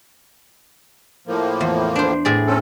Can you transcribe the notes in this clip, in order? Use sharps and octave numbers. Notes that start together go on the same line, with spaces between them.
A2 F3 A#3
E2
D4 C5
A2 G#4 D5
C4 C#4 A4